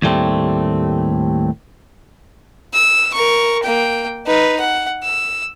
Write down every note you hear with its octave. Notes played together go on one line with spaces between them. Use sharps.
D#2 A2 G3 A3 C4
E6
A#4 C#6
A#3 G5
D#4 B4
F#5
E6